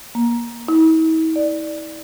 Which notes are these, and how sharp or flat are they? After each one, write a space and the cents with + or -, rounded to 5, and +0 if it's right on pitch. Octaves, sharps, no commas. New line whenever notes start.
A#3 +15
E4 -45
D5 +5